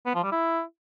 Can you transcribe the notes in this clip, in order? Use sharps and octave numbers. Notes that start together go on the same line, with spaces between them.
B3
F3
G3
E4